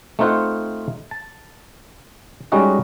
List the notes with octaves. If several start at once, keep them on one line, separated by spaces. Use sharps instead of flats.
A3 C4 D#4 F4 C5 F#5
A5
G3 G#3 C#4 D#4 F#4 D#5